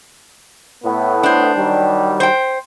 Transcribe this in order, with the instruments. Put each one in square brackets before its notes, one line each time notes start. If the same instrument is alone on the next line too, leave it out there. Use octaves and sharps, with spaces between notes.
[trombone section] A2 B3
[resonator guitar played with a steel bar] D4 C5
[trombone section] D#3 F#3 G3
[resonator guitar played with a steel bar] C5 G5